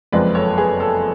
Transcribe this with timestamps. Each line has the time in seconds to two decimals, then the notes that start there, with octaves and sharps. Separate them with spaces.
0.12 F#1 F2 F3 G#3 B4 D5
0.35 A4 C#5
0.57 G#4 B4
0.80 A4